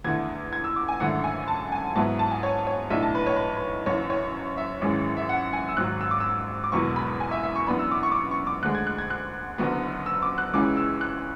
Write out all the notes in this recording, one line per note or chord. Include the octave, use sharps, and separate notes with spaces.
E2 D3 A3 G#6
G#6
E6
D6
G#5
G#1 F#2 D3 A3 E4 F#5
G#5
A5
G#5
G#2 F#3 B3 E4 A5
A5
G#5
C#5
C#5
B1 A2 E3 A3 D4 E5
A5
B4
C#5
B4
B4
F#1 F#2 E3 C#5
C#5
E5
G#1 F#2 E3 G#3 C#4
E5
F#5
G#5
E6
G#1 G#2 F#3 F#6
E6
D6
E6
D6
E1 E2 B2 F#3 C#6
B5
G#5
E5
E5
C#6
F#2 E3 B3 D4 B5
E6
D6
C#6
D6
C#6
C#6
D6
D2 D3 G#3 F#6
G#6
F#6
G#6
F#6
F#1 F#2 D3 F#3 B3
E6
D6
F#6
C#2 C#3 E3 G#3 C#4 D6
E6
F#6